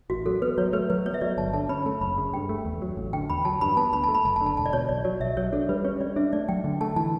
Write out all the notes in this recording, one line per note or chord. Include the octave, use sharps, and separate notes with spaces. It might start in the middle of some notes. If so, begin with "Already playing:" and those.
A1 F#4
F#3 A4
B3 B4
F#3 C#5
A3 B4
F#3 B4
B3 C#5
E5
F#3 D5
G1 A5
D3 A5
C#4 B5
A3 A5
F#1 B5
C#3
G2 G5
A3
E2
F#3
A1
D3 G5
E2 B5
F#3 A5
G2 B5
B3 A5
D2 B5
A5
A3
B5
F#1 A5
A5
D3
A5
E1 A5
D5
B2 C#5
B1 D5
F#3 D5
B1 E5
F#3 C#5
D4 A4
G3 B4
C#4 C#5
G3 D5
D4 E5
A3 D5
F#3 G5
D3
A3 A5
E3 A5